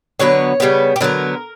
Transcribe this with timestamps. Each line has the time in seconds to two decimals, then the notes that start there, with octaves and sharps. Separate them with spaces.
0.19 D3 F#3 B3 C#5
0.60 C#3 G3 B3
0.96 G4
1.01 D3 F#3 B3 A#4